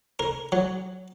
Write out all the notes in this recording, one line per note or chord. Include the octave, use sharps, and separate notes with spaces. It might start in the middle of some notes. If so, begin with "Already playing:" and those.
A#4
F#3